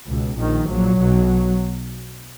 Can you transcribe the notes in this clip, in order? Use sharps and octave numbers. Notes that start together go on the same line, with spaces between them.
C#2 B2
A#1 A#2 D#3
A#1 A#2 F#3
B1 B2